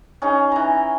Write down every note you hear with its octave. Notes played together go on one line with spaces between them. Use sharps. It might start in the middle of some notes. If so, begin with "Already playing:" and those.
C#4 D#4 G#4
E3 A#5